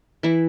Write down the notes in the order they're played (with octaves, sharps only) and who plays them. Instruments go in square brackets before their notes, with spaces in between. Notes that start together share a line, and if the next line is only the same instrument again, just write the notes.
[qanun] E3 E4